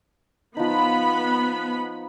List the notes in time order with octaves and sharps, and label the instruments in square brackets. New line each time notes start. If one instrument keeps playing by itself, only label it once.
[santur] F3 D#4 [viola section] B3 B5